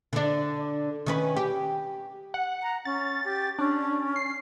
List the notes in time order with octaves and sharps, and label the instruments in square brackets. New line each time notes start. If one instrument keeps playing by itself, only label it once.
[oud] D3 D4
D#3 C#4 B4
G4
[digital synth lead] F#5
[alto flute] A#5
[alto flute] C#4 [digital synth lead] A6
[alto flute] G4
[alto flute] C#4 [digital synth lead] D4
[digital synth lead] C7